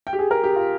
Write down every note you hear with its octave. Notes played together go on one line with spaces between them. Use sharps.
G5
G4
G#4
A#4
G4
F4